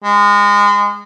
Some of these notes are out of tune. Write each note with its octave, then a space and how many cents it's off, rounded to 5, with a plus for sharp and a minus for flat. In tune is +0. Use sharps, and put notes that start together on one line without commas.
G#3 -25